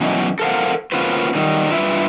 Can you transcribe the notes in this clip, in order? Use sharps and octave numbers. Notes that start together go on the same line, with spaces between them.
B2 E3 F#3 C#4 D#4 E4
A4 A#4 C5 F5 F#5
A#3 C#4 F4 F#4 B4 C5
D#3 F#3 G3 D#4
G2 F4 B4 E5